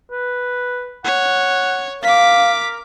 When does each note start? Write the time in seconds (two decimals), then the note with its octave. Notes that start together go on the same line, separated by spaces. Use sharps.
0.11 B4
1.04 C#5 F#5
2.03 A#4 F5 D6 B6